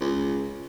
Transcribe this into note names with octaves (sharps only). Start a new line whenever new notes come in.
C#2